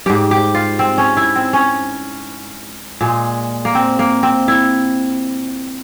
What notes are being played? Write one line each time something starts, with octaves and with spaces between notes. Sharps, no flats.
G#2 G3 G4
G4
F4
C4
C#4
E4
C4
C#4
A#2 G#3
A#3
C4
A#3
C4
E4